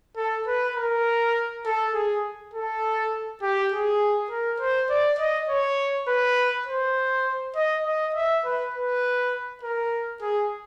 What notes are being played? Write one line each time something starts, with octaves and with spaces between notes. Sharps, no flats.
A4
B4
A#4
A4
G#4
A4
G4
G#4
A#4
C5
D5
D#5
C#5
B4
C5
D#5
D#5
E5
B4
B4
A#4
G#4